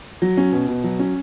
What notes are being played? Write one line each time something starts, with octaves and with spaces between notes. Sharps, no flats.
F#3
C#4
B2
B2
F#3
C#4